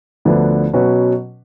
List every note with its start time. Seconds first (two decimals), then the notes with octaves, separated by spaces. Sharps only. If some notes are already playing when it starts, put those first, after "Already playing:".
0.25 D2 D3 F3 B3 D4
0.73 B2 F#3 C#4 F#4 B4